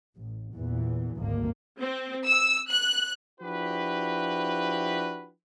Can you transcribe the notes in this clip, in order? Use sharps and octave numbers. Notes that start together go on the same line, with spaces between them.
A1
E2 A#2 E3
G#1 D2 A#3
C4
E6
F#6
F3 D4 E4 F#4 G4 B4